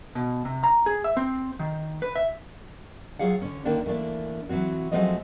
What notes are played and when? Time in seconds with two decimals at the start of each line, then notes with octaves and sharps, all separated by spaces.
0.15 B2
0.45 C3
0.64 A#5
0.86 G#4
1.04 E5
1.17 C4
1.59 D#3
2.02 B4
2.16 E5
3.19 F#3 F4 G#4 F5 F#5
3.42 D3 C#4
3.65 D3 D#3 A#3 D4
3.86 E3 A3 A#3 D4
4.49 E3 F#3 C4 F#4
4.92 F3 F#3 G#3 A3 C4 D#5